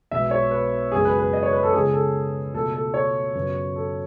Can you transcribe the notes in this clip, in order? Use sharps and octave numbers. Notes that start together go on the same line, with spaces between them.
B1 B2 G#3 B3 E5
C#5
B4
F#2 C#3 G#3 B3 G#4
B4
B4
D#5
C#5
B4
A4
C#2 C#3 G#3 B3 G#4
A4
C#2 B2 A3 A4
A4
C#5
F#2 C#3 F#3 B3
A4